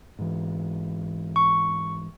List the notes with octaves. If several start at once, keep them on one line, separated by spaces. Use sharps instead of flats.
G#2 E3
C#6